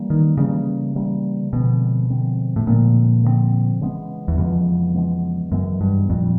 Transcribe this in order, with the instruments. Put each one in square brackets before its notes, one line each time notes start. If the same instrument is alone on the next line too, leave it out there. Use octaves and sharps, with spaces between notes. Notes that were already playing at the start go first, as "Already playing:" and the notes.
Already playing: [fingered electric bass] E3 G3 A#3
[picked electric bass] D#3
[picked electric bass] C#3 [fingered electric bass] E3 G3 A#3
[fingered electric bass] E3 G3 A#3
[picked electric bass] B2 [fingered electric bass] D3 F3 G#3 C4
[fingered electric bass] D3 F3 G#3 C4
[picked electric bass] A2
[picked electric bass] A#2 [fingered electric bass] D3 F3 G#3 C4
[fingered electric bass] D3 F3 G#3 C4
C#3 E3 G#3 B3
[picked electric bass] E2
[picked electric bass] F2 [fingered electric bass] C#3 E3 G#3 B3
[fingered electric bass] C#3 E3 G#3 B3
[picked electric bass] F#2 [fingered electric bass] C#3 E3 G#3 B3
[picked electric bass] G2
[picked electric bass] F2 [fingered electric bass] A#2 G3 C4